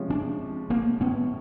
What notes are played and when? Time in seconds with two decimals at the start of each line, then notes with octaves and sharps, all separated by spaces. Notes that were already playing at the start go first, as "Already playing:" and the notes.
Already playing: C3 F3 G#3 C#4
0.10 C4 D4
0.70 A#3 C4
1.01 B3 C#4